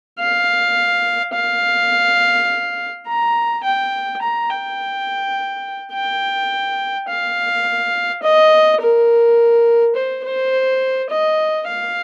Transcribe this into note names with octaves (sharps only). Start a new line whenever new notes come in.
F5
F5
A#5
G5
A#5
G5
G5
F5
D#5
A#4
C5
C5
D#5
F5